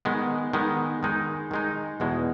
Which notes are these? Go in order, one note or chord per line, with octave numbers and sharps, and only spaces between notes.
D#3 G#3 B3
D#3 G#3 B3
D#3 G#3 D#4
D#3 G#3 D#4
E2 B2 G#3